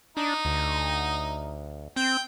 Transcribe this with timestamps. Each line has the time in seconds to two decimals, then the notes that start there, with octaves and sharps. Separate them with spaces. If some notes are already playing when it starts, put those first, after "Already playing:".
0.17 D4 D#4
0.45 D2
1.96 C4 G5